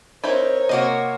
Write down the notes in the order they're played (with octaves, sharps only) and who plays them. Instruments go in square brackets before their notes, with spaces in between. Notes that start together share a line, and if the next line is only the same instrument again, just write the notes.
[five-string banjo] C4 D#4 E4 [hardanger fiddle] A#4 C#5 [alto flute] C5
[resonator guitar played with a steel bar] C3 A#3 F#4 [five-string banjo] D#5